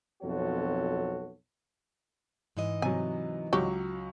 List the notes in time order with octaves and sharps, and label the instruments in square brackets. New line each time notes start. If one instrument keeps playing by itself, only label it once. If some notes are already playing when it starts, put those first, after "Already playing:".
[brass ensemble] B1 F2 C4 F#4 A4 C#5
[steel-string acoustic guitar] G#2 E3 D#5
[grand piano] C3 F#3 [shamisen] G#5
[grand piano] C#2 F#3 C#6 [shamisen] F#4 G4